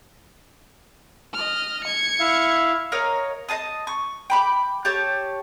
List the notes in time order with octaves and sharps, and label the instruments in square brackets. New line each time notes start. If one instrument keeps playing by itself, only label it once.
[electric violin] D#5 F6
G#6 C#7
[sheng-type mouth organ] E4 E5 F5
[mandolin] A#4 C#5 D#5 F5
D#5 F5 A5 D#6
C#6
G5 B5 D6
G4 C#5 A5